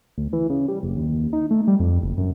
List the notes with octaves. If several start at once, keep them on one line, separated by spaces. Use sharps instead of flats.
D2
E3
C#3
G3
F#1
D#2
D#4
A3
G3
F2
F#1
F#2